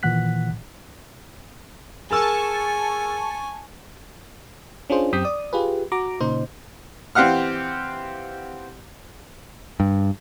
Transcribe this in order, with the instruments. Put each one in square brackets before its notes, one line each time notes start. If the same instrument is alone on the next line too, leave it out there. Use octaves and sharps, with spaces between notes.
[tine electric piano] A#2 D#3 E3 F#5 F#6 B6
[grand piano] G#4 A#4 E6 [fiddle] G#5 [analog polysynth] A5 C#6
[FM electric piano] C#4 D4 F4 G#4 C5
F#2 C4 G4 D#6 G6 B6
D5 D#6
F4 G4 G#4 B4
F#4 A#5 D6
A#2 C#3 D#4 C5
[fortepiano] E3 C4 G4 F5 F#5 F6
[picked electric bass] G2